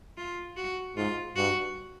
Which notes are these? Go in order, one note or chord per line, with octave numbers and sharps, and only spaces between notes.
F4
F#4
G#2 F4
G2 F#4